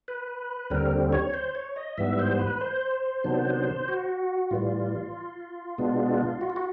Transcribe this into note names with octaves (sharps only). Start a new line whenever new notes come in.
B4
D#2 D3 G3 C4 A#4
C#5
C5
C#5
D#5
G#2 E3 G3 B3 E5
C5
B4
C5
C3 D#3 F#3 B3 D4
F#4
A2 E3 G3 F4
B2 G#3 B3 D4
F#4
F4
F#4